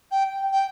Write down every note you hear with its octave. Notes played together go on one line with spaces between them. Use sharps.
G5
G5